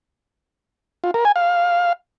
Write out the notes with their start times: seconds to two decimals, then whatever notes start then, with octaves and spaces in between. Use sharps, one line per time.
1.04 F4
1.14 A#4
1.25 G#5
1.36 F5